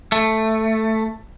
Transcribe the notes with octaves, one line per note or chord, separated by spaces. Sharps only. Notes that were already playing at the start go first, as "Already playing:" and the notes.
A3